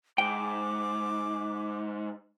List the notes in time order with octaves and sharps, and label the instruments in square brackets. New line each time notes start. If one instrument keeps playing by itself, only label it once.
[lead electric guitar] G#2 [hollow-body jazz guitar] G5 [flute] D6